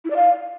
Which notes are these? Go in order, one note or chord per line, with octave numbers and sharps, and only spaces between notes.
E4
D5
F5